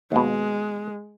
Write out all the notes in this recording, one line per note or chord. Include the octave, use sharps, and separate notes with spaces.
D#2 B2 G#3